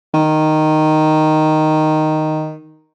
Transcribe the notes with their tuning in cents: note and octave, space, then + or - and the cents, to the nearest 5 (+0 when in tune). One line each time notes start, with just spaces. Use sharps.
D#3 -5